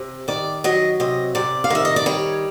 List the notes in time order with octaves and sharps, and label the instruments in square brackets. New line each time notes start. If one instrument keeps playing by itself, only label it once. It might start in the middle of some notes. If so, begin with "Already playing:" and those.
Already playing: [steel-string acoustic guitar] C3
D#3 D5
F#3 D#5
C3 D#5
C3 D5
F5
D#3 E5
D#5
D5
G3 C#5